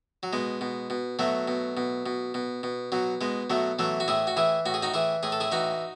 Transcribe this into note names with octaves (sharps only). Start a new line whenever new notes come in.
F#3
B2 G#3
B2
B2
B2 F#3 A3
B2
B2
B2
B2
B2
B2 F#3
B2 G#3
B2 F#3 A3
E3 F#3 A3
F#4
A2 E4 G#4
F#4
E3 E4 G#4
A2 F#4
G#4
D#4 F#4
E3 E4 G#4
A2 G#4
A4
E4 G#4
E3 D#4 F#4